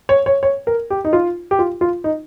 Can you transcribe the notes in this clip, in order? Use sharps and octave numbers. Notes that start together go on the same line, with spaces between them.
C#5
C#5
C#5
A#4
G4
D#4
F4
G4
F4
F4
D#4